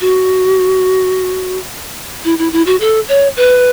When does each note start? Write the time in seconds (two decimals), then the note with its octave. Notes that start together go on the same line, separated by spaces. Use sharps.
0.01 F#4
2.25 E4
2.39 E4
2.53 E4
2.66 F#4
2.80 A4
3.09 C#5
3.37 B4